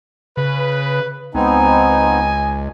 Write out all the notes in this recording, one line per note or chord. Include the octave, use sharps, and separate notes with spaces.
C#3 B4
C#2 B3 C4 D#4 D#5 G#5